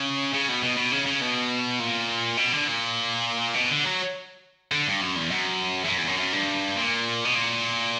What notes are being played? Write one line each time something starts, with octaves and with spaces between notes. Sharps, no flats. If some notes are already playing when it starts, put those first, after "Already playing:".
Already playing: C#3
C#3
B2
B2
B2
C#3
C#3
B2
A#2
B2
D3
A#2
B2
D3
F#3
D3
G2
F#2
E2
F#2
E2
F#2
E2
F#2
F#2
G2
A#2
B2
A#2